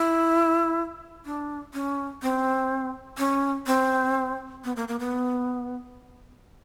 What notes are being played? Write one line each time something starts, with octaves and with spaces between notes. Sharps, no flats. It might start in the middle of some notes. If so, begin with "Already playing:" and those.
Already playing: E4
D4
C#4
C4
C#4
C4
B3
A#3
A#3
B3